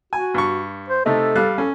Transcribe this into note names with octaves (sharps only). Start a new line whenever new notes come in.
F#4 G#5
G2 C#6
C5
C3 A3 D#4 A4
G3 F5 F#6
C#4 A4